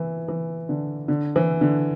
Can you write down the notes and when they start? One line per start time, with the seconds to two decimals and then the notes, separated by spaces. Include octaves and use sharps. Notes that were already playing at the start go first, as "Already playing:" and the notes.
Already playing: E3
0.28 E3
0.69 D3
1.08 D3
1.36 E3
1.61 D3